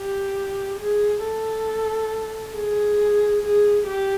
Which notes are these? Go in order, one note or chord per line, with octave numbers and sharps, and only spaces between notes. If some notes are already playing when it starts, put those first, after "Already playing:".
Already playing: G4
G#4
A4
G#4
G#4
G4